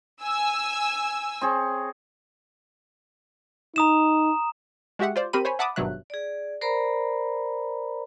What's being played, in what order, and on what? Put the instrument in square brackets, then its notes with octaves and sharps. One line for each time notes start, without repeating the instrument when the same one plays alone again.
[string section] G#5 E6
[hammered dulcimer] C4 G#4 C#5
[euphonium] D#4 [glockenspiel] A#5 D#6 E7
[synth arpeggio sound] G#3 F#4 G4 E5 F#5
F4 C5 D5
C4 G4 A#4 C5 B5 D#7
C5 C#5 G#5 B5
E5 F#5 A5 B5 D6 D#6
G#1 G2 B2 F#3 E5 F#6
[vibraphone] G#4 D5
A#4 C5 D5 A#5 B5